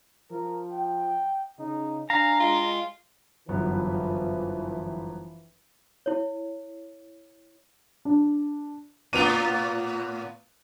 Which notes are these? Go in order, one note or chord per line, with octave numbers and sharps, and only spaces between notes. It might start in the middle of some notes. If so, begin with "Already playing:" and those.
F3 A#4
G5
C#3 D#4
D4 F5 G#5 A#5
G#3 F4
G1 F#2 E3 F3 B3
E4 C#5
D4
A2 B3 F4 D#7 F7